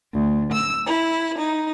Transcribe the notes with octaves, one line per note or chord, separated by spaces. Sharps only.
D2
E6
E4
D#4